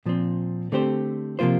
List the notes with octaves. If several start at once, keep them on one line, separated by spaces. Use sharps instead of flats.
A#2 F3 C4
D3 A3 C4 G4 C5
C3 F3 A#3 F4 C5